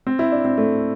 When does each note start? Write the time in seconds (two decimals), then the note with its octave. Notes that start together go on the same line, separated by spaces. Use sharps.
0.07 C4
0.19 E4
0.32 D4
0.45 C4
0.57 A3